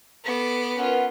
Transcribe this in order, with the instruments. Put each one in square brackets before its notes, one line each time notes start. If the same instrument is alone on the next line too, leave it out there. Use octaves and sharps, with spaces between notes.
[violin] B3 [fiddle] A4 D6
[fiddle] C#4 F4 [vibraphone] A#4 B4 [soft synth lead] F#5